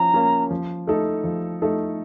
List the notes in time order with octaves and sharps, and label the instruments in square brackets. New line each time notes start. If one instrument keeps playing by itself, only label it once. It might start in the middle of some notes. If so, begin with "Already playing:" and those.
Already playing: [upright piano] F3 C#4 [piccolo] A#5
[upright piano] A#3 C#4
F3
A3 D#4 A4
F3
A3 D#4 A4